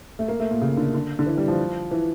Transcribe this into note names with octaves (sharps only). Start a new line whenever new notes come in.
A3
A#3
A3
A#2
C#3
D3
D3
D3
E3
G3
F3
E3